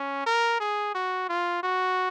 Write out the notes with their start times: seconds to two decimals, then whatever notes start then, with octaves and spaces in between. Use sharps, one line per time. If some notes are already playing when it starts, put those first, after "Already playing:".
Already playing: C#4
0.26 A#4
0.60 G#4
0.94 F#4
1.29 F4
1.63 F#4